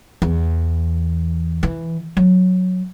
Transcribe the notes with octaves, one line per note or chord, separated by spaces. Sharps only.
E2
E3
F#3